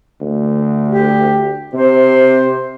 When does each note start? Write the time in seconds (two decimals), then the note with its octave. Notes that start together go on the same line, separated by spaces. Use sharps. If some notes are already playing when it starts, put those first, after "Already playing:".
0.21 D2
0.88 G4
1.74 C3 C5